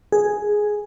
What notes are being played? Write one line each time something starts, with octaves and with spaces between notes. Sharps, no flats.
G#4